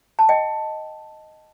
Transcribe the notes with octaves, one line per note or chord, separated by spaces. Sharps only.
A5
D#5 G5